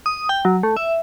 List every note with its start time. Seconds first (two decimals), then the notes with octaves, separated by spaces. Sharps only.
0.06 D#6
0.29 G5
0.45 F#3
0.63 A3
0.77 E5